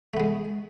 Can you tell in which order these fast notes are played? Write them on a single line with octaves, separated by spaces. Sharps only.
A3 B3 G#3